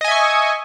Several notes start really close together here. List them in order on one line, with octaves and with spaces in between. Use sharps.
D#5 G#5 E5 C#6